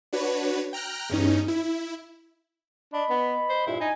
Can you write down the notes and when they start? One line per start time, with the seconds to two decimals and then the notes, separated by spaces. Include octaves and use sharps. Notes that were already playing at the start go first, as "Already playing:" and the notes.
0.13 D4 F#4 B4 C#5
0.73 G5 A#5 F6 F#6
1.09 E2 G2 C#4 D#4
1.48 E4
2.93 D4 D#5 B5
3.10 B3
3.49 C5
3.67 E2 G2 A#2 E4
3.81 D#4 D#5 G#5